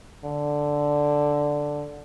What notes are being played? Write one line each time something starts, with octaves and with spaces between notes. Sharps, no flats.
D3